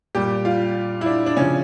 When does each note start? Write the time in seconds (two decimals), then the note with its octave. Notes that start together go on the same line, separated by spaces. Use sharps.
0.15 A#2 G3 G4
0.45 F4
1.01 E4
1.06 D4
1.26 D4
1.37 C#3 F3 C#4